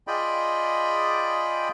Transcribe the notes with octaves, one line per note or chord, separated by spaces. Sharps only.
F4 G#4 D5 D#5 G5 B5